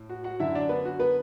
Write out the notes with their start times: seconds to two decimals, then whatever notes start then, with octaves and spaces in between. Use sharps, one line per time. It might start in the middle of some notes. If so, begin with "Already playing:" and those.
Already playing: A2
0.09 F#4
0.24 F#4 F#5
0.40 F#2 D3 F#3 E4 E5
0.55 D4 D5
0.69 B3 B4
0.85 F#4
1.00 B3 B4